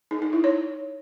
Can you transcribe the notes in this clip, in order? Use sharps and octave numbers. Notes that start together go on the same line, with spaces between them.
D#4
D#4
E4
C#5